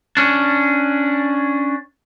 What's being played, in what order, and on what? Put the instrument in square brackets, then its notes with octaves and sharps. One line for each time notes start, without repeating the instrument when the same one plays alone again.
[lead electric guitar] C#4 D4